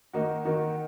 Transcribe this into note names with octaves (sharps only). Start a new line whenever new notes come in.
D#3 A#3 D#4 F#4
D#3 A#3 D#4 F#4